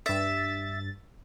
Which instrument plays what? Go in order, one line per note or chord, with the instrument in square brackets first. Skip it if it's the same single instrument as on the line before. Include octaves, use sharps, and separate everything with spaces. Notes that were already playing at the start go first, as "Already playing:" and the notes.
[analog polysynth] G2 A6 [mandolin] E5